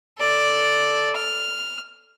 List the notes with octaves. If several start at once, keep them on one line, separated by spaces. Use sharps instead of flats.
A4 D5
F6